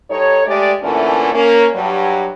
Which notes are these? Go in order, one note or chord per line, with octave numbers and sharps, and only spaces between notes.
G2 D#4 A4 C#5
G#3 A3 G4 D5
A#2 D3 E3 A3 C#4 A4
A#3 C#4
G2 F#3